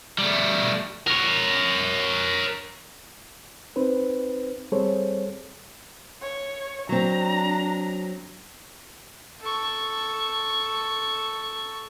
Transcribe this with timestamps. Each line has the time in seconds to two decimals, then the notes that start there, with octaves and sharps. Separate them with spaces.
0.18 G3 A3
1.07 A#4 C#5
3.76 C4 D#4 B4 C5
4.72 G3 C4 G#4 A4 C5 C#5
6.22 C#5
6.89 F#3 C4 D4 A#5
9.41 A4 C#6